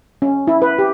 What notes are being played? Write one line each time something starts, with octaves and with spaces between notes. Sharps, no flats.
C#4
E4
B4
G4